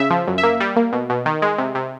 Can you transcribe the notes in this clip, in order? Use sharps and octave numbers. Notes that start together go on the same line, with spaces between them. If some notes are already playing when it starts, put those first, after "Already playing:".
Already playing: C#3 E5
F3
F#2
E5
A#3
G3
A#3
B2
B2
D#3
G#3
C3
C3